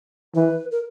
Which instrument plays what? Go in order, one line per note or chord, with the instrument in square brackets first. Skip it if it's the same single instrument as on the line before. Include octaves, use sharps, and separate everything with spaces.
[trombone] E3 [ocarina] B4
[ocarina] A#4